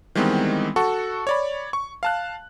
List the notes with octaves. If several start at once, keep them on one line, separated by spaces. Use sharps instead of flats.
D#3 E3 G3 G#3 B3 C4
F#4 A4 F#5 C#6
C#5 D5 B5
C#6
F5 A5 F#6